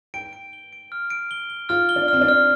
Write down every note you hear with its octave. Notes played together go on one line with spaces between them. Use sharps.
G5 D7
D7
G7
D7
F6
D7
G7
G7
F4 F6
G7
D4
C4 F6
D4
F6